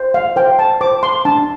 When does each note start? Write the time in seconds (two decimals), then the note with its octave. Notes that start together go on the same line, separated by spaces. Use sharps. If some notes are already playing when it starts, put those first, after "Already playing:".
Already playing: C5
0.14 F5
0.36 C5 G5
0.59 A5
0.81 C5 D6
1.03 C6
1.25 D4 A5